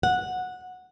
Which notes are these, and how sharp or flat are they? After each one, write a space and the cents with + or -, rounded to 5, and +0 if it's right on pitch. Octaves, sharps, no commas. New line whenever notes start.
F#5 -10